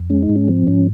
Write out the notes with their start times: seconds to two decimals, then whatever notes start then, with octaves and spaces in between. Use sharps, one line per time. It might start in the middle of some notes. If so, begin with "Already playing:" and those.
Already playing: F2
0.10 G#3 C#4
0.23 D#4
0.29 G#2
0.36 C#4
0.48 F3 C4
0.67 G#2 C#4